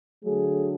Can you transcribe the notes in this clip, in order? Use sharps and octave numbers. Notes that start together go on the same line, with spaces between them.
D3 F#3 A3 G#4